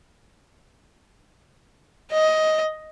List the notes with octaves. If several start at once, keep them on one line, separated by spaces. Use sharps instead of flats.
D#5